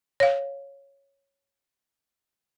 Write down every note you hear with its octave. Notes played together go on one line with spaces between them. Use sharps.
C#5 F5